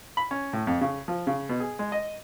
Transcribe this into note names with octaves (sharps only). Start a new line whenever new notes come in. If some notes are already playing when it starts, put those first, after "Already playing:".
B5
C#4
A2
F2
C#3
F3
C#3
B2
G#4
G#3
D#5